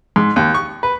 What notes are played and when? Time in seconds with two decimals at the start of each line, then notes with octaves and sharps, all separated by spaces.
0.16 G#2
0.36 D#2
0.54 C#6
0.83 B4